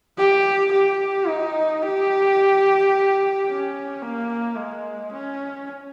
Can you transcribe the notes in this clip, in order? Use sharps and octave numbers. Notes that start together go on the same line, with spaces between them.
G4
G4
D#4
G4
C#4
A#3
G#3
C#4